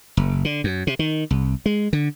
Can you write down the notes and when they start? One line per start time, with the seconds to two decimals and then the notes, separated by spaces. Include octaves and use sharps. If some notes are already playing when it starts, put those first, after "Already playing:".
0.17 F#1
0.45 D3
0.64 F#2
0.87 C3
0.99 D#3
1.30 C2
1.66 G#3
1.93 D3